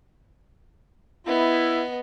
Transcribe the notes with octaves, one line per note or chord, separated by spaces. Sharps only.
B3 E4 D#5